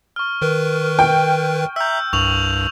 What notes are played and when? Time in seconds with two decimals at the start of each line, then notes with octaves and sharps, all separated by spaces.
0.16 C#6 F6
0.42 D#3 A#4 B4
0.99 G5
1.76 E5 A#5 E6 G6
2.13 C2 G2 C#6 F7 F#7